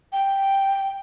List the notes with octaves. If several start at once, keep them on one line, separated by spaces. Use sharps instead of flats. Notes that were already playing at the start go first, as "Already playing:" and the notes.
G5